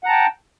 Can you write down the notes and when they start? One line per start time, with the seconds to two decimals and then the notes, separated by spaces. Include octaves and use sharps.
0.04 F#5
0.06 A#5
0.09 A5
0.11 G5